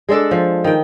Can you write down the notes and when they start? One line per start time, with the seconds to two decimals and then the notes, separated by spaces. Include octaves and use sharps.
0.09 G#3 D4 A4 D5
0.31 F3
0.64 D#3 G5